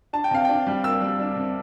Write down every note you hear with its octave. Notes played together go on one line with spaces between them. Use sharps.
D4 A5
G5
C3 F5
D4 G5
G3
A#3 E6
G3
D4
C3